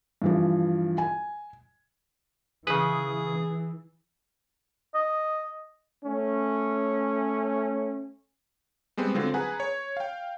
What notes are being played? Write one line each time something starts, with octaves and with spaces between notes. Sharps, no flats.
G2 E3 F3
G#5
C#3 E3 G#4 B4
D#5
A3 C#4
G3 G#3 B3 C4
D3 F#3 C4 F4
G#4 B4 F#5 G#5 A#5
C#5
F5 G5